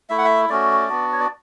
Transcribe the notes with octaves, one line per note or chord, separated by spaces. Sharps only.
A3 E4 E5
F#5
E5
A3 C#4 F#4 D5
B3 D4 F#4
C#5
D5